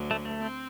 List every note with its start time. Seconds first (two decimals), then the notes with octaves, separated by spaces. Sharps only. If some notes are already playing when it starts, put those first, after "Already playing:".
Already playing: D2 D3 F#3
0.11 A3
0.25 A3
0.39 C4